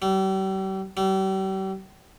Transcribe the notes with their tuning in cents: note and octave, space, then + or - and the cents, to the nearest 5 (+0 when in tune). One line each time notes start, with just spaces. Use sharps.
G3 -40
G3 -40